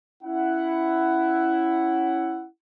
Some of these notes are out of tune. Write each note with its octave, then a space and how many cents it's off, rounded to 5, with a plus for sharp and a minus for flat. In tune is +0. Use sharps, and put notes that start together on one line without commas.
C#4 +0 E4 +5 F#5 +10